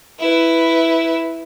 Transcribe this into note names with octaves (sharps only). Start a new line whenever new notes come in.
E4 B4